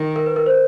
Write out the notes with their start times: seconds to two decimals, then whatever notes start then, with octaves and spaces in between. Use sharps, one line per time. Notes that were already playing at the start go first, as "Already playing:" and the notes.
Already playing: D#3
0.16 A#4
0.26 B4
0.36 A#4
0.46 C5